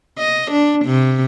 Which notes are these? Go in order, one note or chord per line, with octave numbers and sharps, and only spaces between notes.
D#5
D4
C3